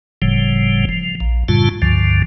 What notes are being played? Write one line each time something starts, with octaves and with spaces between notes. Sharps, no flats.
F#1 A2 C#3 F3 G3
F3
A#1
F#2 A2 C#3 G3 F4 A5
C#2 G2 D3 F3